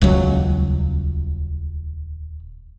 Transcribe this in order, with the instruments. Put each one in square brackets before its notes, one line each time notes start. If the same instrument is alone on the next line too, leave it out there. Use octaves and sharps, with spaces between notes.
[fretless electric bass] D#1 C#2 F#3